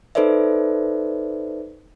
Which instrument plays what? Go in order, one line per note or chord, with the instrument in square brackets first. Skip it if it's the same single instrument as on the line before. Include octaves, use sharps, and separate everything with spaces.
[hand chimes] D#4 A4 B4 C5 D5 E5